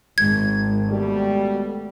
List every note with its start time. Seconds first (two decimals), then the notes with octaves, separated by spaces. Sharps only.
0.18 G#1 G#6
0.90 B2 G3 A3